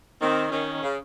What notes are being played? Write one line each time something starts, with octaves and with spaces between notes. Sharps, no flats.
D#3 C4
D#3 C#4
C#3